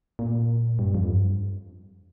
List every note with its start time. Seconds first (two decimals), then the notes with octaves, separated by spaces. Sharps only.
0.19 A#2
0.79 G2
0.94 F2
1.10 G2